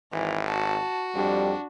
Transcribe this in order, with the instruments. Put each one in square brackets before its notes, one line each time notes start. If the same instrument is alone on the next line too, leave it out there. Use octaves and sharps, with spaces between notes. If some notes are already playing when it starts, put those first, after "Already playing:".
[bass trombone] G#1 [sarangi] E3
[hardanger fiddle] F#4 [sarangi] A5
[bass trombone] F2 [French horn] G3 [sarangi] D4